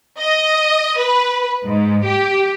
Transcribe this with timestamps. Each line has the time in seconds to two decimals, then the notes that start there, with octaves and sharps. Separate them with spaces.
0.18 D#5
0.98 B4
1.65 G#2
2.04 G4